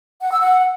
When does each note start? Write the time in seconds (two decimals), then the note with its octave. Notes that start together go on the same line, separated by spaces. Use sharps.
0.22 F#5
0.31 E6
0.41 F#5